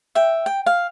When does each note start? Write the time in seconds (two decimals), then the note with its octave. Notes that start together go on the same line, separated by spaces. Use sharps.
0.15 E5 G5
0.46 G5
0.66 F5